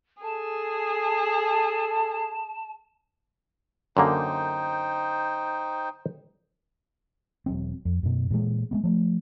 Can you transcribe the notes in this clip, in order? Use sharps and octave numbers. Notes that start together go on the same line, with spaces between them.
G#4 A4 A5
F#2 D3 A#3 D#4 C5 G5
E1 F#3 C4
F2
F#2 B2
A#2 E3 G#3
G#3 A3 B3
F3 A3